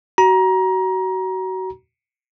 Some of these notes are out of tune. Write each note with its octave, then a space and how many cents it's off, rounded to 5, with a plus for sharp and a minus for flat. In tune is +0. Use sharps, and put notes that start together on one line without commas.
F#4 +25 A#5 +25